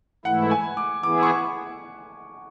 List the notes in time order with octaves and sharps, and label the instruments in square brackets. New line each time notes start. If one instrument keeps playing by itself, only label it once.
[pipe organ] G#2 E3 A3 E4 [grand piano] F#5
[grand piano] G#5
D6
[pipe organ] E3 B3 E4 G#4 [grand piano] D6
[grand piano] C#6